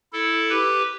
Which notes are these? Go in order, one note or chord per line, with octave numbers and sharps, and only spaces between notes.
E4 A4
G4 B4